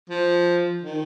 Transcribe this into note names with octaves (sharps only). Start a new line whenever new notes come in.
F3
D#3